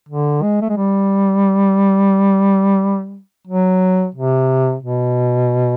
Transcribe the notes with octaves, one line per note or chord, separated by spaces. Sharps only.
D3
G#3
A3
G#3
G3
F#3
C3
B2